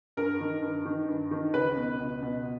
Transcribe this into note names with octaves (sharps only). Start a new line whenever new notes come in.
G2 A#4
D#3
G2
D#3
G2
D#3
C#2 B4
B2
C#2
B2